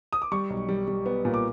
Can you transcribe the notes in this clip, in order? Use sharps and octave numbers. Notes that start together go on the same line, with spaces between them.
D#6
D6
G3 C#6
B1
G3
G3
B3
A#2
D6